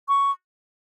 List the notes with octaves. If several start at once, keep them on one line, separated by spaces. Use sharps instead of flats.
C#6